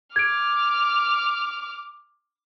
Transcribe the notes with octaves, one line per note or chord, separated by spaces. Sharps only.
D6 F6 G#6 D7